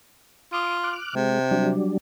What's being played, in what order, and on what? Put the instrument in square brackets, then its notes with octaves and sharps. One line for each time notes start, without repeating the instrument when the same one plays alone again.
[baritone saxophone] F4 [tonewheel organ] D6 D#6
[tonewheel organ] D6 F6 F#6
[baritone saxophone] C3 [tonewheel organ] G#3
[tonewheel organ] F#3 G3 D4